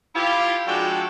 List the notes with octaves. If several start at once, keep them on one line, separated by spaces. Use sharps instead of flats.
E4 F4 G4
F3 G#3 D4 F#4 A4 G5